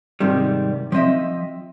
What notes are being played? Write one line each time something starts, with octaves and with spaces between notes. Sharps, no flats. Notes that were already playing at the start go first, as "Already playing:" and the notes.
G#2 C3 D#3 G3
F3 C4 D#5 E5